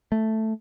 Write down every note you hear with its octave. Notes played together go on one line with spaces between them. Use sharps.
A3